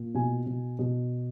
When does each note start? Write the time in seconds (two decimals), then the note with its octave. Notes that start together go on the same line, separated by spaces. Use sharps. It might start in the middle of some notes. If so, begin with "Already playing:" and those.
Already playing: A#2
0.15 B2 G#5
0.46 B2
0.79 B2